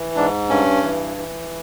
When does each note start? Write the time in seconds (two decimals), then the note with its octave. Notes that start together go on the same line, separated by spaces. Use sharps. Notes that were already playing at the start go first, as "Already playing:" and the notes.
Already playing: E3
0.15 G#2 D4
0.49 G2 C#4
0.83 E3
1.17 E3